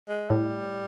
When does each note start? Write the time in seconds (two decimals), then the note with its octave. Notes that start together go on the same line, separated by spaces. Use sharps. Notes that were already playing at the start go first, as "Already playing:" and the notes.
0.08 G#3
0.30 A2 G3